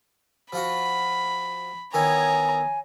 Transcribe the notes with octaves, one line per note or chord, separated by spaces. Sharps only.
F3 F4 F#4 B5
D#3 E3 B3 C#5 G#5 A#5